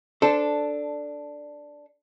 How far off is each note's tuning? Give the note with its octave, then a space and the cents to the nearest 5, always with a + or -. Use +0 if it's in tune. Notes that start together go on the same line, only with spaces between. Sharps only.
D4 +0 A4 +0 C5 -10